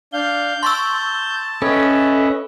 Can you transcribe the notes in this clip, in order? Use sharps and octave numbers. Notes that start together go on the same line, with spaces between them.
D4 F5 G6
A5 C6 C#6 E6
C#4 A4 B4 D#5 E5